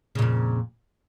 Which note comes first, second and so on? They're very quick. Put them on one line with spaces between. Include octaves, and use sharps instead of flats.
C#3 A#2 F2